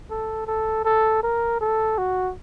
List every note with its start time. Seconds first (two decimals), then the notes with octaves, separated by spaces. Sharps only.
0.10 A4
0.47 A4
0.85 A4
1.23 A#4
1.61 A4
1.98 F#4